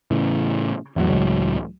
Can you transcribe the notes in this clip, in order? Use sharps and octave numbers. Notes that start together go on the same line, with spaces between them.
A2 C#3 E3
A1 E2 A2 F#3
C#2